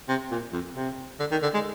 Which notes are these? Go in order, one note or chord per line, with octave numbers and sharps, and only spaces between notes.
C3
A#2
F2
C3
D3
D#3
D3
G#3